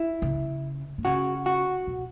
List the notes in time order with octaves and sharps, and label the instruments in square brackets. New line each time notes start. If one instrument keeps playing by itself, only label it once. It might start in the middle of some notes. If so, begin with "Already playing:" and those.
Already playing: [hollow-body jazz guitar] E4
[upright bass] C#3
D3
[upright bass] C#3 [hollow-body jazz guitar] F#4
[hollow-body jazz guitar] F#4
[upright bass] B2